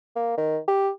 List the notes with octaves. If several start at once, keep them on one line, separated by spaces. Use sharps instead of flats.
A#3
D#3
G4